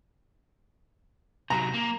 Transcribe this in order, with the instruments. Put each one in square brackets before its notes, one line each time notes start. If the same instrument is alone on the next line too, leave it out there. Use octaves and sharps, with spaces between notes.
[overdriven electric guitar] C3 F#3 [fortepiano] A#5
[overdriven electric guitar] A#3